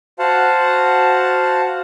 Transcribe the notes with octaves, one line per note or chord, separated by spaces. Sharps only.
F#4 C5 F5 F#5 A5